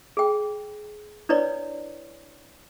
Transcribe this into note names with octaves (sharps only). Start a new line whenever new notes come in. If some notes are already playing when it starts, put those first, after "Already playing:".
G#4 G5
D4 E4 B4 C#5 D5